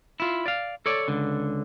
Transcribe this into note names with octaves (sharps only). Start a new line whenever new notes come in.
E4 F4
D5 F5
A4 C#5 D5
C#2 D3